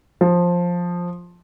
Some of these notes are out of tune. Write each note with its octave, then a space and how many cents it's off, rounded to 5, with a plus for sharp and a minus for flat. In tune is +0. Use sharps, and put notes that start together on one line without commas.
F3 +10